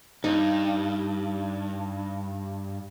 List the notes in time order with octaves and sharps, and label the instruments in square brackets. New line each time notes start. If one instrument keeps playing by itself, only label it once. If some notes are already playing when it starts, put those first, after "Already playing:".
[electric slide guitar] G2 [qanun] D#4